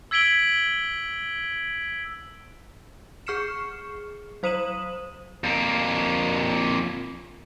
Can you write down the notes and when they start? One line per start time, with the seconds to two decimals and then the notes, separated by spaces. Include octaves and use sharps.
0.11 E6 G#6 B6 D7 F#7 G7
3.27 G#4 C#6 F6 C7 C#7 E7
4.43 F#3 C5 D#6 D#7 E7 F#7
5.44 F2 A#3